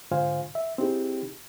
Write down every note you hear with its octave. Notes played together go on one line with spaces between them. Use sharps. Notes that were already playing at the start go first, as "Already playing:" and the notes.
G#2 D3 F4 C5 F5 G#5
E5
C4 D#4 E4 G4 G#4